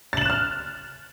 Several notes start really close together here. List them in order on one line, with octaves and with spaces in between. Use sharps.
A6 F#7 E7 F#6 F6